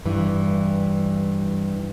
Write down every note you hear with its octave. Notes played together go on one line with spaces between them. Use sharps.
G2 E3